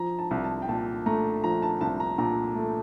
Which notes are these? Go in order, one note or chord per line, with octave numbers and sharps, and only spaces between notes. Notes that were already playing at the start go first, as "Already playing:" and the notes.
Already playing: F3 A#5
A5
C2
A5
G5
A#2 A5
A3 A#5
F3 A#5
A5
C2 A5
A#5
A#2 A#5
A3